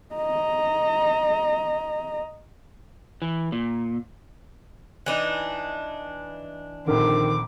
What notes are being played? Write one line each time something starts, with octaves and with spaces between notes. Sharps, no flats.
D#5 A#5
E3
A#2
E3 D4 D#4
A#1 D3 D#3 C4 D6